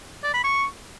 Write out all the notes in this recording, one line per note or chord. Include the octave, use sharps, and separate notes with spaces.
D5
B5
C#6